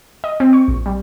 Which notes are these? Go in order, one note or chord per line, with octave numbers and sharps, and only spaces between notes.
D#5
C4
C#6
A#1
G3